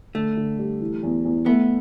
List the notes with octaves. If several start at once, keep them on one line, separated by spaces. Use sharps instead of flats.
D3 A3
D3
G3
E3
E2
E2
A3 B3